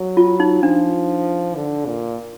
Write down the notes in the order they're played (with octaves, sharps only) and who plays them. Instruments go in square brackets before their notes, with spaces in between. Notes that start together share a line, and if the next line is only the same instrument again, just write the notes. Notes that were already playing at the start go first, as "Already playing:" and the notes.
Already playing: [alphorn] F#3
[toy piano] F4
D#4
[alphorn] F3 [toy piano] D4
[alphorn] D3
A#2